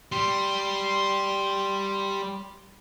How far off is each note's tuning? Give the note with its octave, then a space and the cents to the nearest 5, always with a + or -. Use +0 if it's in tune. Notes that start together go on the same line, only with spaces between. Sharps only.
G3 +0 C6 +0